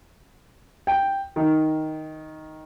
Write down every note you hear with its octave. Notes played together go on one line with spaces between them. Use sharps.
G5
D#3